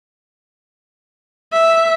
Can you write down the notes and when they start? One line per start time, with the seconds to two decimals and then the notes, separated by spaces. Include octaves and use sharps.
1.53 E5